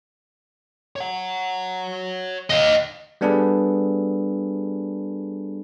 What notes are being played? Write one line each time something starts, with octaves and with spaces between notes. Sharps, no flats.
C#5 F#5
D#5 F5
G3 B3 D4 G#4 A4 B4